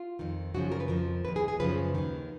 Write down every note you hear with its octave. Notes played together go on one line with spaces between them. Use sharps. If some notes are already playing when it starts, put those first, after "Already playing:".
Already playing: F4
F2 D#3
F#2 C#3 F3 F#4
A#4
B4
F2 F3 A#4
D#2 D#3 B4
G#4
G#4
F#2 C#3 F3 B4
D#2 D#3